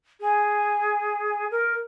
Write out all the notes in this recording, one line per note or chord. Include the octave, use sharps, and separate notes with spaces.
G#4
A#4